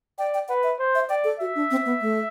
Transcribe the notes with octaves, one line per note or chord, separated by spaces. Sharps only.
D5 G5
G5
B4 F#5
E5
C5
E5
D5 G5
A4
F#4 E5
D4
C4
B3
A3